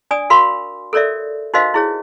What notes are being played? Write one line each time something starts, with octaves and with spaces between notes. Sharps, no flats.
D4 D5 G#5 D#6
F#4 A#4 F5 B5 C6
A4 A#4 C#5 D5 E5
D#4 F#4 A#4 C5 D#5 F5
E4 G#4 C#5